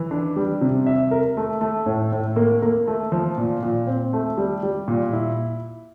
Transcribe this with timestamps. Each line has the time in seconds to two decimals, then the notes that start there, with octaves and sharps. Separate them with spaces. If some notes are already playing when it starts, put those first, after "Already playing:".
Already playing: E3
0.11 D4
0.36 G3
0.61 C3
0.86 E5
1.11 A#4
1.37 A3
1.61 A3
1.86 A2
2.12 A2
2.36 A#3
2.62 A#3
2.87 A3
3.12 F3
3.38 A#2
3.63 A#2
3.87 C4
4.13 A3
4.38 G3
4.63 G3
4.88 A#2
5.13 E4